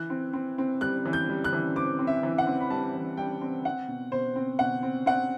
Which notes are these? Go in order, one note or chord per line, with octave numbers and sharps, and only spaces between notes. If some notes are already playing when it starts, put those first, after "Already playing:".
Already playing: E3 F#6
C4
C4
C4
G3 F#6
E3
G6
G3
F#6
E3
C4 D6
C4
E5
E3
F#5
C4
B5
G3 A5
E3
G3 G5
C4
C4 F#5
B2
B2 C5
C4
B2 F#5
C4
C4 F#5